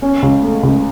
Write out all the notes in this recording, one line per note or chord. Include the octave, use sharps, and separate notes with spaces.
C#4
C#2
A3
C#2